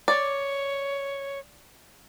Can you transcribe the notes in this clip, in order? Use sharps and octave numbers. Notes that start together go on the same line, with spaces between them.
C#5 D5